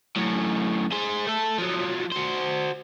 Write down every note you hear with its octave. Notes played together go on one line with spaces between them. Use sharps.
F#2 A2
G#4 C5
A3 A4
F3 F#3
F#4 C5